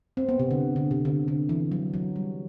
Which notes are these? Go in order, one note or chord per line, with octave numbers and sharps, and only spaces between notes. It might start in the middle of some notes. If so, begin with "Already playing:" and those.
C4
B3
C3
D3
D3
C3
D3
D3
E3
F#3
F#3
G3